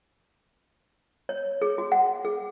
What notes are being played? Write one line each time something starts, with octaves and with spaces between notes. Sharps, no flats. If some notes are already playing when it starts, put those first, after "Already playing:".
C#5
G#4
F#4
F#5
G#4